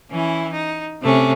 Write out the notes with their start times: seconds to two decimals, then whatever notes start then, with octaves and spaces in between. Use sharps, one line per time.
0.10 E3 C#4 E4
0.53 D#4
1.01 C3 A3 C#4